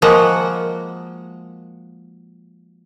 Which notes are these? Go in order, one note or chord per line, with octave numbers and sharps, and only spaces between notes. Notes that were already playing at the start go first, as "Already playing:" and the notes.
F3 G#3 A#3 F#4 F#5